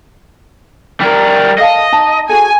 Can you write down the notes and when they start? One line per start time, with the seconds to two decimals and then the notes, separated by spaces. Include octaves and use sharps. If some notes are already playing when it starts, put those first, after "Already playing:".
1.01 G3 A#4
1.58 A4 D#5 F5 A5
1.92 D#4 A5 A#5
2.29 F#4 G#4 A4 G#5